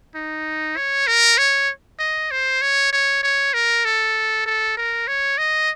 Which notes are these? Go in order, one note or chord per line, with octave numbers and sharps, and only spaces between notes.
D#4
C#5
A#4
C#5
D#5
C5
C#5
C#5
C#5
A#4
A4
A4
A#4
C#5
D#5